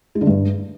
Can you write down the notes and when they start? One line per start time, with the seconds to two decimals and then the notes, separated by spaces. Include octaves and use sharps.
0.15 G#3
0.21 D3
0.27 G2